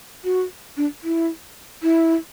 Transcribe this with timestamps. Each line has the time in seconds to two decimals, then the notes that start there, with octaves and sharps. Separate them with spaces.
0.25 F#4
0.77 D4
1.04 E4
1.83 E4